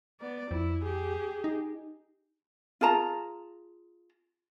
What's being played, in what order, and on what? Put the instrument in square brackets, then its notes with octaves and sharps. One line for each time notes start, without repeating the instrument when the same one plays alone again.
[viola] B3 D5
[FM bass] F2 [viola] E4
[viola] G4 G#4
[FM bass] D#4
[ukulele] F4 G#4 A5 A#5